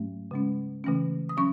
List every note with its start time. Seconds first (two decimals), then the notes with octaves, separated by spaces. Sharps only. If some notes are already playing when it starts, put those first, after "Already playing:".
Already playing: G#2 F#3 A3 C#4
0.31 C#3 G#3 C#4
0.84 C#3 E3 A3 C#4
1.29 D#6
1.37 F#3 C#4 C#6